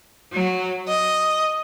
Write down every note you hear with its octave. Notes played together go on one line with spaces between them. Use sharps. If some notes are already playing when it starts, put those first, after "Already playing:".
F#3
D#5